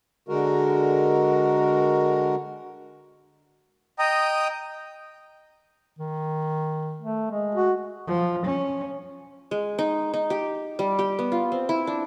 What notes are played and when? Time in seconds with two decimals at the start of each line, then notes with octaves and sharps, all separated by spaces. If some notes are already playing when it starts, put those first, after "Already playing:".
0.29 D3 G#3 F#4 A#4
3.99 D#5 G5 A#5 D#6
5.99 D#3
7.01 A3
7.31 G#3
7.55 F#4
8.07 F3
8.46 C#4
9.51 G#3
9.79 D#4
10.14 D#4
10.30 G4
10.79 G3
10.99 G4
11.19 B3
11.32 F4
11.52 C4
11.69 E4
11.87 D4